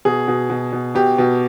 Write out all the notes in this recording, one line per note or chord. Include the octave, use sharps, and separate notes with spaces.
B2 G#4
B2
B2
B2
B2 G4
B2